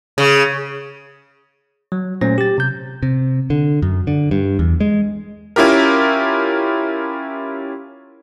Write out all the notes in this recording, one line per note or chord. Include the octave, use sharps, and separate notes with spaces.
C#3
F#3
A#2 F#3 A3 C#4 C5 A#6
G4 A6
C3 G6
C3
D3
F#2
D3
G2
E2
G#3
C#4 E4 F4 G4 A#4